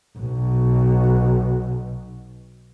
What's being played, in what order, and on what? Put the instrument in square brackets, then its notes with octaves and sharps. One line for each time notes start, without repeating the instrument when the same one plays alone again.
[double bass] B1 B2